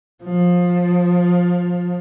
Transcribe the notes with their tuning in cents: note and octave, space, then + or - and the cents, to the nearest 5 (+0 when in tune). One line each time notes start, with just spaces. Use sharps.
F3 +20